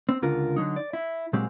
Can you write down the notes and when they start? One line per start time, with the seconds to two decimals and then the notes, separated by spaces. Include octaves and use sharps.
0.09 C4
0.22 C#2 D3 F4 A#4
0.56 D3 F#3 D#4
0.76 D5
0.93 E4
1.33 A#2 F#3 G#3 C4 G4